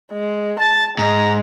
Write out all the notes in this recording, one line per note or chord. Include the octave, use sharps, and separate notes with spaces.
G#3
A5 A6
G#2 G#3 A#5